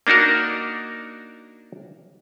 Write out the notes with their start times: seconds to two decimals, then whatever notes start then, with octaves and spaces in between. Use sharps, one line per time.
0.07 A#3 D4 D#4 F#4 A#4